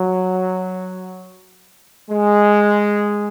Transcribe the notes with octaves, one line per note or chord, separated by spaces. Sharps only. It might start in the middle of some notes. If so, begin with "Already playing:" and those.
Already playing: F#3
G#3